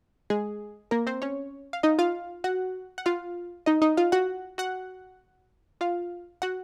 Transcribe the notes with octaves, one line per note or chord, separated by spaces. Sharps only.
G#3 G#4
A#3 A#4
C4 C5
C#4 C#5
F5
D#4 D#5
F4 F5
F#4 F#5
F#5
F4 F5
D#4 D#5
D#4 D#5
F4 F5
F#4 F#5
F#4 F#5
F4 F5
F#4 F#5